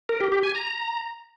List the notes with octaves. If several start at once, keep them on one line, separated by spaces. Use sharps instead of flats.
A#4
G4
G4
G#5
A#5